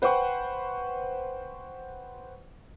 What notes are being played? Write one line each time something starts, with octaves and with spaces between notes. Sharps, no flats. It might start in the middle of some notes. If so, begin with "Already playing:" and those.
B4 C5 F#5 G5 C#6